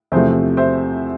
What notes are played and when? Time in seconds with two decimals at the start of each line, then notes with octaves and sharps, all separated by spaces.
0.12 E2 C3 F3 A3 C5 E5
0.57 C5 E5